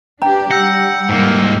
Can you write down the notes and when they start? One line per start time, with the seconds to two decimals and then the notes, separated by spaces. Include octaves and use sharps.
0.22 D4 G4 G5 A#5
0.51 G3 F#5 E6 G6 A#6
1.09 G#2 A#3